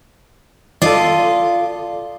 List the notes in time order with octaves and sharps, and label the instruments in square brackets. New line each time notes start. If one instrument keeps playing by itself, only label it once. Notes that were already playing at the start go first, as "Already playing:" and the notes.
[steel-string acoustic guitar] F4 D#5 [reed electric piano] A4 D5